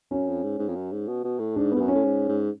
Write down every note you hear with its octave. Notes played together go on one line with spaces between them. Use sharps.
F#2 C#4
F2
G#2
G#2
F2
F#2
G#2
B2
B2
A2
G#2 D4
G#2 B3
F#2
C#4
A2
G#2
G#2